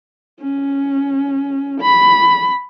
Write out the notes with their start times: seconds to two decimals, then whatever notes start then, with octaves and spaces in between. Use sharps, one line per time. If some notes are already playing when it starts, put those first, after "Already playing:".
0.41 C#4
1.81 B5